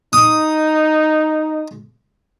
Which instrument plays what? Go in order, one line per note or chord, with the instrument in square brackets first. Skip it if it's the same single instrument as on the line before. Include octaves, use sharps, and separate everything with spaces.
[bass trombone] D#4 [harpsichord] D#6